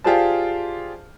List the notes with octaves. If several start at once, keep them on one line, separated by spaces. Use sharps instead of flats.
F4 G4 G#4 C5 D5 A5